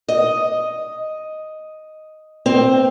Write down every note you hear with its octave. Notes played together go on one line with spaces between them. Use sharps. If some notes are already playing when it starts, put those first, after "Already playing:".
D#5
C4